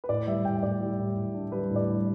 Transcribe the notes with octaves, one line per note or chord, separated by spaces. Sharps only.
B4
A2 D5
G3 E5
A2 G5
A2 D5
G3
A2
A2
D4
G3 B4
A2
D5
G3